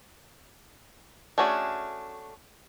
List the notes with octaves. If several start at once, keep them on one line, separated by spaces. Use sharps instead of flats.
A3 C#4 D4 F#4 G#4